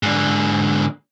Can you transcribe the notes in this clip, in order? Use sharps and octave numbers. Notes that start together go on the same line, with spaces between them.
G#2 D3